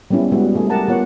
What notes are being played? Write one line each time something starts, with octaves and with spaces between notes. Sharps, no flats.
G3 A#3 B3 C#4 E4
G3 G#3 B3 F#4 G#4
G3 A3 G#4
G4 A#4 F#5 A5 A#5
A#3 B3 F4 C#5 F#5